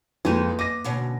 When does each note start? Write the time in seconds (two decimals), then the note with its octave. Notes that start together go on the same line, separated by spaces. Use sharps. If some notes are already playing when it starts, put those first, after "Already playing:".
0.25 F2 G#3 A#3 D#4 B4
0.59 D#5 D6 A#6
0.84 D2 B2 C#4